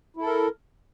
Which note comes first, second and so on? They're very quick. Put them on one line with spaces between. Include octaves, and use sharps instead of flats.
E4 A4 A#4